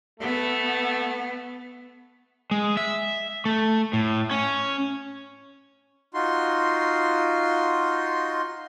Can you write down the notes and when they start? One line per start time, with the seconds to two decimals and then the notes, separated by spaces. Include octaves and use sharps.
0.20 A3 B3
2.51 G#3
2.77 E5
3.45 A3
3.93 A2
4.31 C#4
6.14 D#4 F4 F#4 C6